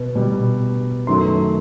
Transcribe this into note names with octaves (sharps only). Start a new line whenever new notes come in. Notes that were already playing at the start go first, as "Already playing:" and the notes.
Already playing: B2
B2 G3
F#2 D#3 F#3 A3 C6